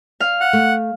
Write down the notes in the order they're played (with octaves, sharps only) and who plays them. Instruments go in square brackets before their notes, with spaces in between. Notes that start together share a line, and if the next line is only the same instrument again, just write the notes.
[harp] F5
[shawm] F#5
[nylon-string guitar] A3